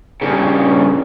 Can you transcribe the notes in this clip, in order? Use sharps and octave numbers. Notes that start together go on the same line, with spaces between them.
G2 C#3